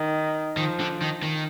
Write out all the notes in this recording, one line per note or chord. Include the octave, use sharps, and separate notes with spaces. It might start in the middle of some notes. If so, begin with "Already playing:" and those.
Already playing: D#3
D#3 F3
D3
D#3
D#3